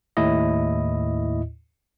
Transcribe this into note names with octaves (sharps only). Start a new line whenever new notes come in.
D#2 A2 E4 D#5